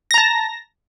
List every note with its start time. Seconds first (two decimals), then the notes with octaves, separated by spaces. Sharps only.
0.11 A#6
0.14 A#5
0.18 A5